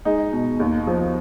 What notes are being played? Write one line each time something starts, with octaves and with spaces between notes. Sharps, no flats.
G#3 D#4
B2
D#2
F3